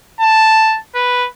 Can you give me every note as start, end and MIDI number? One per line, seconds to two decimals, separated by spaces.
0.21 0.78 81
0.95 1.27 71